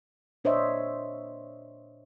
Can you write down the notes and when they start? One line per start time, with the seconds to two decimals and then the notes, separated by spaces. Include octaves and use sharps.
0.44 A#2 D4 C5 C#5 D#5 E5